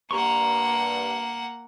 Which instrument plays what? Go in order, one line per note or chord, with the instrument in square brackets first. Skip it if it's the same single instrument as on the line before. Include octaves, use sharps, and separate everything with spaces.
[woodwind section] G2 [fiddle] A#3 F#5 [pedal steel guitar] A#5 C6 C#6